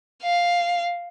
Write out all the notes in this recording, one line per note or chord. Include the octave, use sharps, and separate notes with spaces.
F5